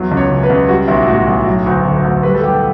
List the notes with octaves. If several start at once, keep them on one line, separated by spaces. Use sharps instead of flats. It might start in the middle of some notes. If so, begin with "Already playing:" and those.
Already playing: E2 F#3
C#2
C#5
C#3
B4
C#2
G3 F#4
B1 E4
A2 F#4
B1
F#3
D2
D3
D2
G3 B4
A4
B1 G4
A4